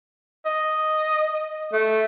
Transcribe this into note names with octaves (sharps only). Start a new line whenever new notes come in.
D#5
A3